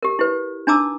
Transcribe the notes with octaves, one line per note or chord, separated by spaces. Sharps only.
G4 A#4
E4 G4 B4
D4 D#4 A5 A#5 D6 E6